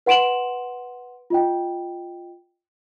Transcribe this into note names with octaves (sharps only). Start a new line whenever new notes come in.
B4 F#5 C6 D7 E7 F#7
F4 D#5 G5